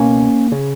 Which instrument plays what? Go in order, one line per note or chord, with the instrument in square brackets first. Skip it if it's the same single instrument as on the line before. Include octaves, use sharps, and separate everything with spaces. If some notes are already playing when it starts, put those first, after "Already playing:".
Already playing: [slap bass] C#2 B2 A#3 C#4
C#3